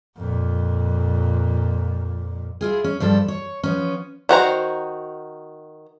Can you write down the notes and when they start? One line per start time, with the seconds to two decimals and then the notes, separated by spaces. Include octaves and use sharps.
0.18 F2 A#2
2.61 E4 F4 G#4
2.84 C#4
3.00 G2 F3 G3 A4
3.28 C#5
3.63 F3 B3 C#4
4.29 D#3 F#4 C5 A#5